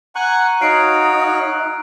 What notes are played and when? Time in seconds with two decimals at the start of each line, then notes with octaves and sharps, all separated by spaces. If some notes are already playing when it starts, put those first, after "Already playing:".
0.15 F#5 G#5 A#5 C#6 F#6
0.61 D#4 F#4 C#5 F5 F6 C7 D7